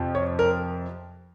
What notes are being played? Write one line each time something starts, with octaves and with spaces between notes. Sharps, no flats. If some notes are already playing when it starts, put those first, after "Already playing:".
Already playing: F2 C3 F3
C#5
A#4